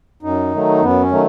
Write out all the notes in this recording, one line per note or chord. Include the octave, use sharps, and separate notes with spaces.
F#2 D#4
D#3 F#3 A3
F#2 B3
C#4
D#3 F#3 A3